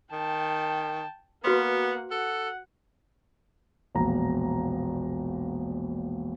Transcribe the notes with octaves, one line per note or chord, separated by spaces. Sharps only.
D#3 G5 A5
A#3 B3 F#4 B4 F#5 C6
A4 F#5
E1 A#1 A#5